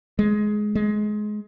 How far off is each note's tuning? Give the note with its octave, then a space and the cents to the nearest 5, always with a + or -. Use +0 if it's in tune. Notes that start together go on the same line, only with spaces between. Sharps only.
G#3 +15
G#3 +20